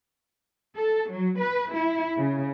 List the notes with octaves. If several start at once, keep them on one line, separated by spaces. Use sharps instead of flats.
A4
F#3
B4
E4
C#3